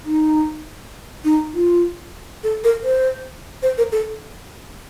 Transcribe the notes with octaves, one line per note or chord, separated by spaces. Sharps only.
D#4
D#4
F4
A4
A#4
C5
C5
A#4
A4